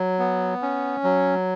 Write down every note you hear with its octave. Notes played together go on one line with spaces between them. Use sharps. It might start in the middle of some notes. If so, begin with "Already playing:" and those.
Already playing: F#3
B3
C#4
F#3